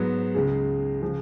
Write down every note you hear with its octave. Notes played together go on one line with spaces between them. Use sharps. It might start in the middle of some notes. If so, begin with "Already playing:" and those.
Already playing: G#2 F#3 B3
C#2 C#3 G#3
C#3 F3 G#3